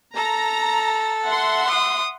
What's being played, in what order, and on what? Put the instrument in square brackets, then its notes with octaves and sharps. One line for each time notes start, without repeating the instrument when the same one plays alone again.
[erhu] A4 [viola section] A#5
[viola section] E5 F#5 C6
[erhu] D#6